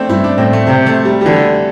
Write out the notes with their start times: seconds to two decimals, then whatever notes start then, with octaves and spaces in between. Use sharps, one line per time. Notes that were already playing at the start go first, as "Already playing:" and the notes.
Already playing: A3 C4 D4
0.09 G2 E4
0.24 D4
0.38 A2 C4
0.53 A3
0.67 C3 C4
0.87 A3
1.05 G3
1.21 G3
1.26 D3 E3